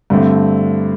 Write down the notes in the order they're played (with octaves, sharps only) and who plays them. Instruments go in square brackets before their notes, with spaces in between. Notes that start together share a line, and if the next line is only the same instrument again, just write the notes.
[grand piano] G2 D3 A3 C4